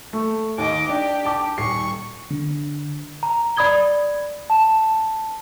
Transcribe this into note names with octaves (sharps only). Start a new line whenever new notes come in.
A3
D#2 D#5 D6
D4 G4
A5 D6
D#1 C#6 C7
D3
A#5
D5 B5 D#6 G#6 G7
A5